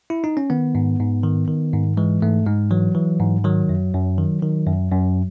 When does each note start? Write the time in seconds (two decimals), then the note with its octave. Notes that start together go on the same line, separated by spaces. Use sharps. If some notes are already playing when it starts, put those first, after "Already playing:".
0.10 E4
0.24 D#4
0.37 C#4
0.50 D#3 B3
0.75 G#2
0.99 G#2
1.23 D#3
1.48 D#3
1.73 G#2
1.97 E3 G#3
2.22 G#2 A3
2.46 G#2 G#3
2.71 E3 F#3
2.95 E3
3.20 G#2
3.44 D#3 F#3
3.69 F#2
3.94 F#2
4.18 D#3
4.42 D#3
4.67 F#2
4.92 F#2